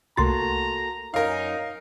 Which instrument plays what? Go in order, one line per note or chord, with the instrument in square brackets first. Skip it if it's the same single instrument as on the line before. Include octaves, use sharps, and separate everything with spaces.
[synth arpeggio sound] C2 C6 A6 [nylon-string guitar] A3 A#3 F#4 [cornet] A#5
[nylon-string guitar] F#2 G#5 [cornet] D#4 [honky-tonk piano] A#4 F5